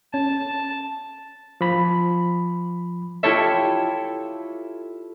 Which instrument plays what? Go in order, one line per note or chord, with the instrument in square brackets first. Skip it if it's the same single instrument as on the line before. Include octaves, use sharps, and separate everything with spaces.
[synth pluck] C#4 [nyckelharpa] A5
[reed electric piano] F3 B5
[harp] E4 F4 G4 A4 C#5 E5